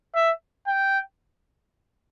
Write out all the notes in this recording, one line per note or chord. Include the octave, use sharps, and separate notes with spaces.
E5
G5